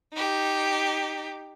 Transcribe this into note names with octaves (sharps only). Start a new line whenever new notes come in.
D#4 G4